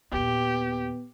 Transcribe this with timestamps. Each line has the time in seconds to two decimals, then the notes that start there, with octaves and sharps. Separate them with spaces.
0.12 D#2 A#2 B3 G4